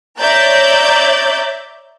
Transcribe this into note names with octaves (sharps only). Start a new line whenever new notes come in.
C#5 D5 E5 A#5 G6 A6